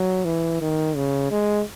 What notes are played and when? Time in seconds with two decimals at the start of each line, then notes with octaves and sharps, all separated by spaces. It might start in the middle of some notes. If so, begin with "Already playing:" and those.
Already playing: F#3
0.25 E3
0.61 D#3
0.96 C#3
1.31 G#3